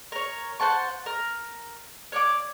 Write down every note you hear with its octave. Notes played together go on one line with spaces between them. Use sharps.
A#4 C#5
C5 F#5 A5 C#6
A#4
C#5 D5 D6